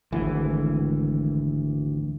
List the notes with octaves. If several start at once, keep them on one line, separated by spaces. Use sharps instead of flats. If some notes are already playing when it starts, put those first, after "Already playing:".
G#1 D2 E3